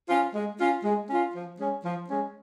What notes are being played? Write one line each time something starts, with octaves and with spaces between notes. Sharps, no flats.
C#4 F4
G#3
C#4 F4
G#3
C#4 F4
F3
G#3 C#4
F3
G#3 C#4